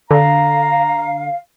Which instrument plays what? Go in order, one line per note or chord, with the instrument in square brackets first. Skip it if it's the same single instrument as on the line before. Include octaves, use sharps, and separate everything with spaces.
[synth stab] D3 [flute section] F5 [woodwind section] A#5